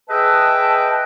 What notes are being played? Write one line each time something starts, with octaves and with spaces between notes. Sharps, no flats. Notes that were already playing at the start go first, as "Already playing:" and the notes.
G#4 B4 D#5 E5 G5 A5